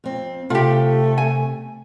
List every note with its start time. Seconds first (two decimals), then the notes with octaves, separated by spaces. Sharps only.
0.04 F2 C4
0.50 C3 A3 F4 G4
1.18 G#5